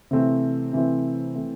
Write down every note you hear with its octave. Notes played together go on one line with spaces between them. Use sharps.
C3 E3 A3 C4
C3 E3 A3 C4
E3 A3 C4 E4